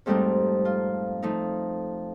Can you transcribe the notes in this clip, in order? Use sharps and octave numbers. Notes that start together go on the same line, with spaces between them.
F2 G#2 G3 A3 C4 D#4
F4
F3 A3 D#4